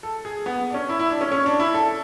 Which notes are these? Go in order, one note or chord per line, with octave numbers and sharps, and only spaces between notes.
A4
G#4
B3
D4
C#4
E4
E4
D4
C#4
C#4
D4
E4
A4